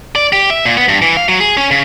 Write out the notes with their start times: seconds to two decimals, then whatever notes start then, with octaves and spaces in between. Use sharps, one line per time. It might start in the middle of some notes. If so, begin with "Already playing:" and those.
0.16 D5
0.33 G4
0.50 E5
0.65 A#2
0.77 B3
0.89 G2
1.02 E3
1.17 F5
1.29 F#3
1.40 G#4
1.57 C#4
1.71 C#3